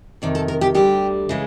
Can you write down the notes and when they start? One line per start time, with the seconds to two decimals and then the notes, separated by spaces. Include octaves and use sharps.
0.22 F2 C3 D#3 D5
0.35 A4
0.48 A#4
0.61 G4
0.74 D2 D3 G3 G4
1.29 C#3 E3 G#3